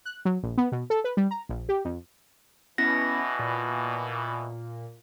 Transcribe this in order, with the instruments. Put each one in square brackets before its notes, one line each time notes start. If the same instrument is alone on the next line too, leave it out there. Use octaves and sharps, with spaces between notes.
[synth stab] F#6
F#3
A#1
B3
B2
A4
B4
G3
A#5
A#1
G4
F2
[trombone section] B2 E3 [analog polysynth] B3 C#4 E4 [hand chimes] A#6
[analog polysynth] A#2